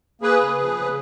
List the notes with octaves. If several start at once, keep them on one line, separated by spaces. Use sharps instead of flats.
A#3 G#4 B4
C#3
F3
C#3